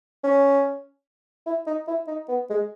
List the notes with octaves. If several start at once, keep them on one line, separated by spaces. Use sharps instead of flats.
C#4
E4
D#4
E4
D#4
B3
G#3